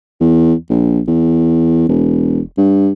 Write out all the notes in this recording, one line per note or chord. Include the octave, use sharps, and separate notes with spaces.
E2
A#1
E2
E1
G2